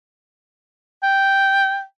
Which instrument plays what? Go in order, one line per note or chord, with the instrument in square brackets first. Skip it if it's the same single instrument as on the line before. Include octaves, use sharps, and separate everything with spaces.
[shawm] G5